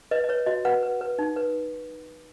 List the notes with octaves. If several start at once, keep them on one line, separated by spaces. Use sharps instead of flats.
B4 D#5
D#5
B4 C#5
F#4 D#5
B4 F#5
B4
B4
D#4
B4